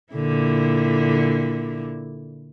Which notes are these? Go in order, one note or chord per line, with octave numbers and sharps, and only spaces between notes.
A#2 D3 E4